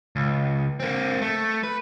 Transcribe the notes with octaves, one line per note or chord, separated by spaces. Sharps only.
C#2
A#3 C4
A3
B4